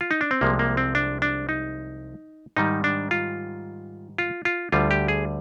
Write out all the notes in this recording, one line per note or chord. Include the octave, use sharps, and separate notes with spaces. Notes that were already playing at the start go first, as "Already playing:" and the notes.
F4
D#4
D4
C4
C2 C3 F3 G#3 A#3
A#3
C4
D4
D4
D#4
G#2 D#3 G3 D#4
D4
F4
F4
F4
D2 D3 G3 F4
G4
G#4